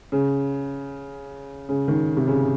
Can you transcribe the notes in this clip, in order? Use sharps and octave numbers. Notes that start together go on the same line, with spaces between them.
C#3
C#3
D#3
C3
C#3